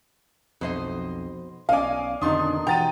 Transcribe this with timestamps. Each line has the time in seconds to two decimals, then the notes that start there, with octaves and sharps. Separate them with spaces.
0.61 B1 F2 B2 C5 D#5
1.69 B1 C#4 D5 D#5 F5 G#5
2.21 F2 B2 D3 D#3 D4 D#4 C6 D#6
2.67 B2 E3 F#5 G5 A#5 A6 D#7